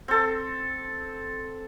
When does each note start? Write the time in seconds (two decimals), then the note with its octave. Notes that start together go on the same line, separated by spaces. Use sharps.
0.08 C4 A4